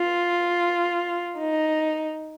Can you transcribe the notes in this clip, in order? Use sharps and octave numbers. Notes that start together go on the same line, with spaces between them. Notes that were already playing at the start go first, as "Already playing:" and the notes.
Already playing: F4
D#4